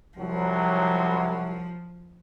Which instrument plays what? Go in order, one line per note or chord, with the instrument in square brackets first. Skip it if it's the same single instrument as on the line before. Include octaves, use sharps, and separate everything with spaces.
[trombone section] C2 F#3 [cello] F3